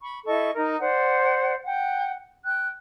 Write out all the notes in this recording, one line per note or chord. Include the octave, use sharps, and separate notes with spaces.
B5 C#6
E4 A4 D#5 C#6
D#4 A#4
C5 D5 F#5
F#5 G5
G5 F#6